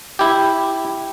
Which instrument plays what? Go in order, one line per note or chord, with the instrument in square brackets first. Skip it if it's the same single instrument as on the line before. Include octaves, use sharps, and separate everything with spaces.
[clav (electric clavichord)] E4 G4